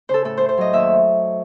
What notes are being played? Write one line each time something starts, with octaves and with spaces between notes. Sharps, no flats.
C#3 A4 C5
A2 A4
A3 C5
C5
F#3 D#5
D#2 E5